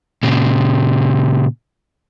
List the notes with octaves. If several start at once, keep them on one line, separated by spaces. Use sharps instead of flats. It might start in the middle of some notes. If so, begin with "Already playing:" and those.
A#2 C#3